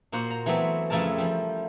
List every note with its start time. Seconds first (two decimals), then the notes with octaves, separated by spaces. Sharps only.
0.12 A#2 A#3 F#4 C5 F#5
0.30 A#5
0.46 E3 F#3 A3 B3 C4
0.90 F2 C#3 A3 E4 A#4 A5
1.18 F3 G3